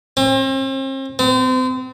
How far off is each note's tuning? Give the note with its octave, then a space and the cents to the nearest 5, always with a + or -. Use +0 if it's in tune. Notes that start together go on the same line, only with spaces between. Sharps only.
C4 +40
C4 -35